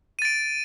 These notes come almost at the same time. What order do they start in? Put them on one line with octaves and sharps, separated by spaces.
D#7 A6 D7